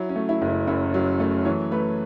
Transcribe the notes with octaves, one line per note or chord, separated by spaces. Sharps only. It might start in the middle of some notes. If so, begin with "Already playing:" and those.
Already playing: F#3 E4
C#4
A3
E4
F#1
E4
F#2 E4
F#3
A3
E3 C#5
A3 B4